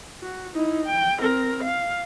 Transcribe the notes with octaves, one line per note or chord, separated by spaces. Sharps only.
F#4
D#4 E4
G5
C4 A#4
F5